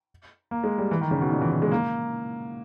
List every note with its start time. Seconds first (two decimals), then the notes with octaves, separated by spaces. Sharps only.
0.51 A#3
0.64 G#3
0.78 G3
0.91 E3
1.01 D#3
1.11 C#3
1.21 B2
1.32 A#2
1.41 E3
1.52 E3
1.62 G#3
1.72 A#3